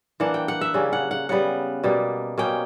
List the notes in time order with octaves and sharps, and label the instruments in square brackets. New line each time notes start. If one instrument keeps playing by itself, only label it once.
[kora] E3 A#3 D4 F#5
G5
F#5
E5
C#3 G3 A#3 C#4
F#5
F#5
C#3 G3 B3 F#5
B2 G3 A#3
B2 A#3 C#4 G5